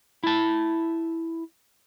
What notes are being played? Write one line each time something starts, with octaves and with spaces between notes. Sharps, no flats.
E4 A5